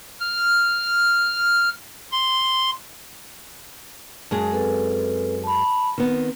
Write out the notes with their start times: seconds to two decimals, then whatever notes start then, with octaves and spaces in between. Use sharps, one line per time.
0.20 F6
2.12 C6
4.31 F#2 G#3 G#4 A5
4.52 C4 A4 B4
5.44 A5 B5
5.98 D#3 B3 C4